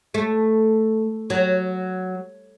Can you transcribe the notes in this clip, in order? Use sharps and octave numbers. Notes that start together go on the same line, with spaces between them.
A3
F#3